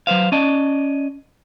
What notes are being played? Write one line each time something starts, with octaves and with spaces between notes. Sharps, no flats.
F#3 B4 C5 F5
C#4 D5 D#5 A5